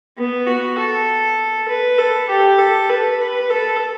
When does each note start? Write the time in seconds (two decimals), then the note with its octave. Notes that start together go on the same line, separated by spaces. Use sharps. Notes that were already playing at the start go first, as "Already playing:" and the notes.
0.18 B3
0.47 F#4
0.78 A4
1.68 B4
1.98 A4
2.29 G4
2.59 A4
2.89 B4
3.19 B4
3.50 A4